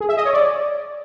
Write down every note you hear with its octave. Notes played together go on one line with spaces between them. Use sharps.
G#4
E5
D#5
C#5
D5